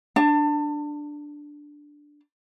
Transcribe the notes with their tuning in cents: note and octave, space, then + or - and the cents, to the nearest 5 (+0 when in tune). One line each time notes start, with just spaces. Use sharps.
D4 +0 A5 +30